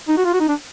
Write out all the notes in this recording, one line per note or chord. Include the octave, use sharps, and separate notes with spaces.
D#4
F#4
F4
F#4
D#4
D4